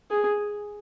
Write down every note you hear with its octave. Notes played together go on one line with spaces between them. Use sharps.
G#4